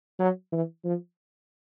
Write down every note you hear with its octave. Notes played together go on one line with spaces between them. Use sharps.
F#3
E3
F3